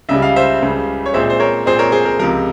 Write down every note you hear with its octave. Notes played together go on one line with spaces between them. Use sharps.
C#2 C#3 G3 E5
F5
C5 E5
C#2 C#3 G3
C#5
A#2 G#3 C4 C5 E5
C5
A#4 C#5
A#2 G#3 C4 G#4 C5
A#4 C#5
G#4 C5
A#4
C#2 C3 F3 A#4